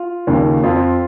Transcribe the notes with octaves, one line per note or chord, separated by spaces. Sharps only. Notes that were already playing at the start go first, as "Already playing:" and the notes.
Already playing: F4
D#2 C#3
F2 F4